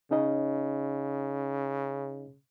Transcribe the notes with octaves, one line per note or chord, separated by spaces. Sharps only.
C#3 C#4 D#4 D#5